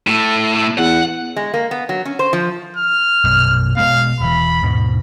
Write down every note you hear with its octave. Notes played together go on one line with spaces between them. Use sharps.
A2 A3
E2 F#5
G#3
A#3
B3
F#3
C#4
C5
F3
F6
A#1 F#2 B2
B2 G#3 B3 F5
E1 E3 B5
D#2 G#2 B2